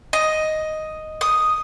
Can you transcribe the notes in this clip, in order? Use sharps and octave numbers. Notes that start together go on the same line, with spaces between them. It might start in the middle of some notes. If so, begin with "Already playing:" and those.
D#5
D#6